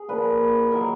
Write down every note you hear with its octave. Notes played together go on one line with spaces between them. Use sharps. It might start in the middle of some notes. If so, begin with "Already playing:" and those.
Already playing: G#4
A#2 F3 B4
D#3 F#3 A#4